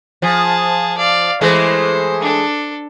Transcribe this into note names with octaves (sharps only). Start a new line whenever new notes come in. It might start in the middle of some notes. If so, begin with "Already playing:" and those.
F3 G#4 A5
D5 F5
E3 G#3 A3 C5
D4 A4